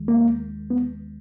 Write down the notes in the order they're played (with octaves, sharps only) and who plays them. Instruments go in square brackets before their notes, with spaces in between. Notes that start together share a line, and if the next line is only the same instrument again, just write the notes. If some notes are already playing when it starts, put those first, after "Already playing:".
Already playing: [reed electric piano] D#2 D#3 G#3
A#3
B3